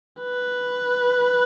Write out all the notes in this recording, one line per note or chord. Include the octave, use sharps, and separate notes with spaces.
B4